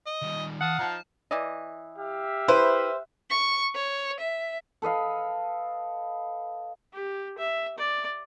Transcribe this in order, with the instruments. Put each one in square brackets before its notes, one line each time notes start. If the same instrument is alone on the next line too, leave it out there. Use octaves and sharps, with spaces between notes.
[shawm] D#5
[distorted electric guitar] D#3 G3
[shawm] F5 [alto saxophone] F#5 [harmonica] A5 D#6
[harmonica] F3 D#4 [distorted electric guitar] A5 A#5
[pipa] E3 D5 D#5
[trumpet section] G4 E5 F5
[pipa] E4 [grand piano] B4 [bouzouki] C5
[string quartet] C#6
C#5
E5
[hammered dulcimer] A4 B4 D#5 F5
[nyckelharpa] G4
E5
D5